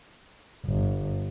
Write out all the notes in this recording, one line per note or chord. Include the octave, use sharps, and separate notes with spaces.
G1